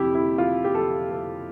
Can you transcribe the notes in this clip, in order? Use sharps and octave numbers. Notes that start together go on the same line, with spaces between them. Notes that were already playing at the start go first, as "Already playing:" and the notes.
Already playing: F2 C3 E4 G4
E4
F4
G4
A4
A4